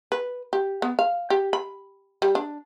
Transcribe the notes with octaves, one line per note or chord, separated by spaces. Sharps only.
B4
G4
B3
F5
G4
B5
G3
D4